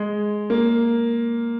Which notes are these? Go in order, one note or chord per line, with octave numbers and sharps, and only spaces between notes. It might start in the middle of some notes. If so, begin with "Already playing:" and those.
Already playing: G#3
A#3